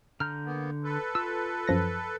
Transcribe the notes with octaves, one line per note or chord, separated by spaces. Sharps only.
D3 A#5 F6 G6
A#3 B3
A4 B4
F4 E6
F#2 F3 A#6